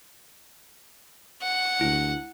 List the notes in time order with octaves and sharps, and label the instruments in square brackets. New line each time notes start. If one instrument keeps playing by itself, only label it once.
[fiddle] F#5
[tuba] D2 [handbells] E4